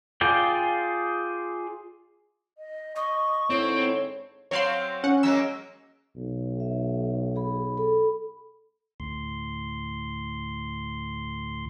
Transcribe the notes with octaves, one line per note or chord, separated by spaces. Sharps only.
F4 G#4 D5 G5
D#5
D#5 C#6
G#2 D3 C4 E4 C#5
F#3 C4 C#5 F5 C6
C#4 F#5
F#3 G#3 A#3 E6
B1
E5
G#4 B5
A4 B5
D2 A2 C6